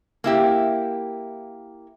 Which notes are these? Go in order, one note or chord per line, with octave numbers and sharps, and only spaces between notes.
A#3 E4 G4